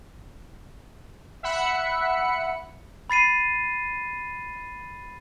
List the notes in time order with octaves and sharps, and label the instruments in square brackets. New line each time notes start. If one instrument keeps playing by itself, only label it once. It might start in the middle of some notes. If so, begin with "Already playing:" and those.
[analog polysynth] E5 F#5 B5 C#7
[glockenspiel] B5 A6 C7 D#7